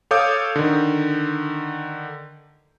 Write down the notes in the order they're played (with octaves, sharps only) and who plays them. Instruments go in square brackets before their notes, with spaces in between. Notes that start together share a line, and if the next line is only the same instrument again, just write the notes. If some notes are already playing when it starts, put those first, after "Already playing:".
[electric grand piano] A4 C#5 F5 D6 D#6 G6
D3 D#3